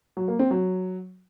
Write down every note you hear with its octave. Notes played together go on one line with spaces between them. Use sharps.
F#3
A#3
C4
F#3